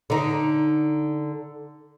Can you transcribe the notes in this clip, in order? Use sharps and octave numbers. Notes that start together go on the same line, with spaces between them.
D3 D#4